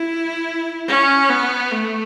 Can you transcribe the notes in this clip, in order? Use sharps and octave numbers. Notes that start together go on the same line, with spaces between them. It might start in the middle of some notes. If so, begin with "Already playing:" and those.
Already playing: E4
C#4
B3
A3